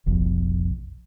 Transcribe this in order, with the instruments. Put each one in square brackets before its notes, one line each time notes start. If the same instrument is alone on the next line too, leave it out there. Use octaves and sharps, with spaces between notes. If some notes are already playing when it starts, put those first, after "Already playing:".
[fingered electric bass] F1 B1 F2